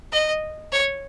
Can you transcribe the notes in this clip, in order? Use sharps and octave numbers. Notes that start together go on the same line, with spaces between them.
D#5
C#5